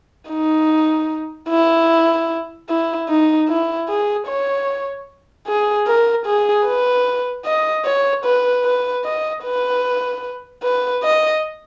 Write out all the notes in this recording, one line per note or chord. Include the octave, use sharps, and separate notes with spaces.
D#4
E4
E4
D#4
E4
G#4
C#5
G#4
A#4
G#4
B4
D#5
C#5
B4
B4
D#5
B4
B4
D#5